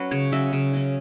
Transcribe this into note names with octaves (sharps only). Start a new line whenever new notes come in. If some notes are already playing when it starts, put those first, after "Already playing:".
Already playing: F#3 C#4 F#4 B4
C#3 C#5
F#3 C#4 E5
C#3
F#3 C#4